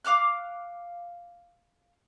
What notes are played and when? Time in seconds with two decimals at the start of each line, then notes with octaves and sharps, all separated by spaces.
0.05 F5 D6 F6 F#6